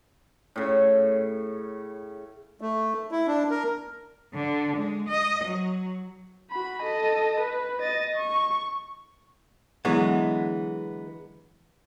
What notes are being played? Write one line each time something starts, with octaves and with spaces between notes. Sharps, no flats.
A2 C#3
A3
E4
D4
A#4
D3
G#3
D#5
F#3
F#4 B5
A4 D#5
B4
D#5 A6
C#6
D3 E3 F#3 G#3 B3